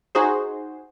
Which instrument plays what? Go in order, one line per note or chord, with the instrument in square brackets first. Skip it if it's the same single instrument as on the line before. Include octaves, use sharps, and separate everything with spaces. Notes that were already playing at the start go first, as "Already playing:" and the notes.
[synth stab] D#4 F#4 G#4 C5